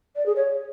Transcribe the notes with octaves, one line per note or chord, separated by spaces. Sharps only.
D5
G#4
C#5